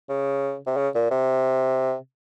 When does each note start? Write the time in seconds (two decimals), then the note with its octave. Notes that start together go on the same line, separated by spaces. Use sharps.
0.09 C#3
0.67 C3
0.77 C#3
0.95 A#2
1.11 C3